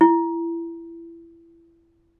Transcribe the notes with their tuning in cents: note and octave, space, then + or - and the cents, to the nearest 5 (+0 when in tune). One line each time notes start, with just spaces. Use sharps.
E4 +25